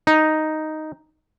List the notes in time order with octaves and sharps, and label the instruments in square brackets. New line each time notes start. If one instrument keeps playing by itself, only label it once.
[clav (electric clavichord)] D#4